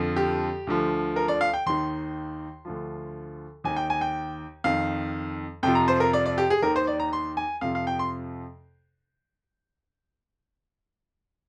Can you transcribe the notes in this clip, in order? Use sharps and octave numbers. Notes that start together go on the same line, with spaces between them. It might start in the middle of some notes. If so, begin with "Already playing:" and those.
Already playing: F2 D3 F3
G4
D2 D3 F3
A#4
D5
F5
G5
D#2 D#3 C6
D2 D3 F3
D#2 D#3 G#5
G5
G#5
G5
F2 D#3 F5
F2 C3 F3 G5
A#5
C5
A#4
D5
D5
G4
G#4
D#2 D#3 A#4
C5
D5
A#5
C6
G#5
F2 C3 F3 F5
F5
G5
C6